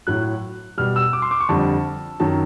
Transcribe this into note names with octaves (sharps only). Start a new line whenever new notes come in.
A2 F#3 F#6
B2 G3 F6
E6
D6
C6
D6
C#6
F2 D3 G3 A5
F#2 D#3 F#3 A5